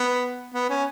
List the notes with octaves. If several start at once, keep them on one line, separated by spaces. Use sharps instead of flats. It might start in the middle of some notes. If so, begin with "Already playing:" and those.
Already playing: B3
B3
C#4